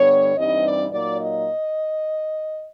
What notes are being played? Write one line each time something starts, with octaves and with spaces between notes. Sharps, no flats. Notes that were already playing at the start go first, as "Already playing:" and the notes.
Already playing: G2 D3 G3 B3 C#5
G2 E3 G3 C4 D#4 D#5
D5
A#2 F#3 A#3 D#4 D5
D#5